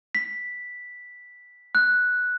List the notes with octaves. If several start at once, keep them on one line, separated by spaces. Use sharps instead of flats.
B6
F#6